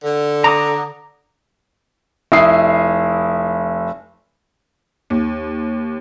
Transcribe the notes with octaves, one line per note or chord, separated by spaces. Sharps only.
D3
A#5 D6 D#6
F1 E4 D#6 C7
D#2